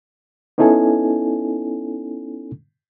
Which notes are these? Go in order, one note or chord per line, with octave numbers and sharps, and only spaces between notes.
B3 C#4 D#4 E4 A4 G#5